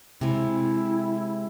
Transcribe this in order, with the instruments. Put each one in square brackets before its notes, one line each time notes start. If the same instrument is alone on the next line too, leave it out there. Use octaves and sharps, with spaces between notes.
[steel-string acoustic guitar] C3 G#3 [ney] E4